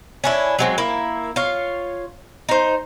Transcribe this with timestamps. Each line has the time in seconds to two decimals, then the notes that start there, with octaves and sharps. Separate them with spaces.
0.24 C#4 D4 E4
0.59 F#3 G#3 C4
0.78 A#3 E4
1.36 F4 C#5 F5
2.49 D#4 C5